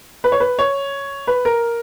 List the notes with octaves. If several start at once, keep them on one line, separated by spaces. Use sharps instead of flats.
B4
C#5
B4
C#5
B4
A#4